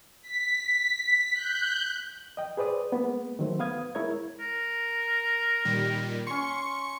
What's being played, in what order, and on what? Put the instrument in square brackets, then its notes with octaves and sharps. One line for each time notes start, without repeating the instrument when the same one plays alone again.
[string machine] B6
F#6 G6
[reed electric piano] D#5 G5
G#4 B4 C5 D5 D#6
G#3 A#3 B3
D#3 F#3 A3 C5
B3 B4 F5 D#6 G#6
G#3 E4 A#4 C#5 G#6
[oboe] A#4
[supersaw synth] A#2 D#3 G3
[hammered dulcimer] C#4 C6 [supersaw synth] C#6 C#7